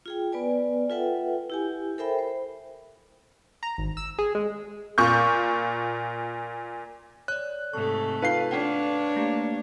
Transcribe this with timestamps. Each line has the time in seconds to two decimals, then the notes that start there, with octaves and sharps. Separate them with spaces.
0.06 F4 G#4 G5
0.32 B3 B4 D5 G#5
0.90 F4 A4 B4 E5 F#5 G5
1.50 E4 G4 G#5
1.98 A4 A#4 C5 E5 G5 B5
2.19 C5
3.63 A#5
3.78 G#1
3.97 E6
4.19 G#4
4.35 G#3
4.98 A#2 C#6 G6
7.28 C#5 D5 F#6
7.73 G#2 C3 A3 A4 C#6
8.22 D#4 F4 B4 F5 C7
8.51 D4 C#5 F#5 G5
9.16 A3 A#3 G4